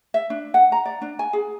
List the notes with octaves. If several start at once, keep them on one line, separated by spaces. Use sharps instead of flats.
E5
D4
F#5
A#5
D5
D4
G#5
G#4